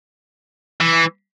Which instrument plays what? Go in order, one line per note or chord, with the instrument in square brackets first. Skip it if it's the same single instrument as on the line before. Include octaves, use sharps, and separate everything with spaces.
[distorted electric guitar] E3